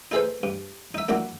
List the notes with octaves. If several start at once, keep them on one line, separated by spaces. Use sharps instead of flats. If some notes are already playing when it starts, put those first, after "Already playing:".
D#4 E4 G#4 A4 B4 C5
G2
D#4 E5
A#3 D4 E4 F#4